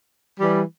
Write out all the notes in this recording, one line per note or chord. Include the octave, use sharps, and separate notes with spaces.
E3 G3